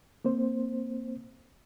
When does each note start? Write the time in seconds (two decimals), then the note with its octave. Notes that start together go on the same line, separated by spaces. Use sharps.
0.25 A#3 C4 C5